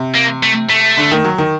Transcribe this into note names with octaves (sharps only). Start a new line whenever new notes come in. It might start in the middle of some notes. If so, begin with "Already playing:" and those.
Already playing: C3
A#3
A3
A3
D3
D#3
F#3
D#3